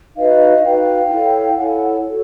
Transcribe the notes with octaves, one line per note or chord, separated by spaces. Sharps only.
D#4 F#4 B4 D#5 F5
D#4 F#4 B4 F5 G5
E4 A4 C#5
E4 A4 C#5 F#5 G#5
F#4 A4 C#5